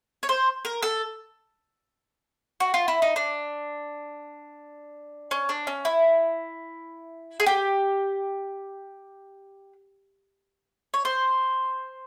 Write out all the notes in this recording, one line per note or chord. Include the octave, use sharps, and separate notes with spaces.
C#5
C5
A#4
A4
F#4
F4
E4
D#4
D4
C#4
D4
C#4
E4
G#4
G4
C#5
C5